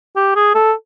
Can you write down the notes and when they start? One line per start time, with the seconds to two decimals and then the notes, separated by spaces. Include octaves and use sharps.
0.16 G4
0.36 G#4
0.55 A4